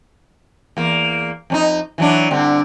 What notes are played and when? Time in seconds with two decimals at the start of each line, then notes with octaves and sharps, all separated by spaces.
0.77 E2 A#3
1.50 F2 C#4 D#4
1.98 E3 F#3 D4
2.30 G2 D3 C4